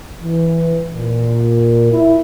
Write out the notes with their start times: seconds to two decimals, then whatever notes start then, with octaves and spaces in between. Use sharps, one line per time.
0.22 E3
0.92 A#2
1.92 E4